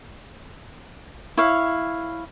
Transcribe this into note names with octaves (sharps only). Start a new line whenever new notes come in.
E4 C#5 F5